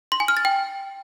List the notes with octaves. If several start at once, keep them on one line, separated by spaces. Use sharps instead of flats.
C6
G#5
F6
A6
G5